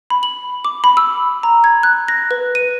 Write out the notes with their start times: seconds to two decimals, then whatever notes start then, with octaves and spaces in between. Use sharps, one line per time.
0.10 B5
0.23 F#7
0.65 D6
0.84 B5
0.97 E6
1.43 A#5
1.64 G#6
1.83 F#6
2.08 A#6
2.31 B4
2.55 D#7